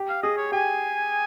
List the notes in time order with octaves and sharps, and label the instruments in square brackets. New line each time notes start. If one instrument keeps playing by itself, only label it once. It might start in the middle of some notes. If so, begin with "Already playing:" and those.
Already playing: [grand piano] G4
[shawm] F5
[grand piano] G#4 [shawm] D#5
[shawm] C#5
[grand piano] G4 [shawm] G#5